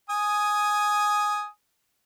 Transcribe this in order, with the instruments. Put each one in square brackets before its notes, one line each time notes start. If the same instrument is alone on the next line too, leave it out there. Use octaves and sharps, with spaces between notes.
[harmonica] G#5 D#6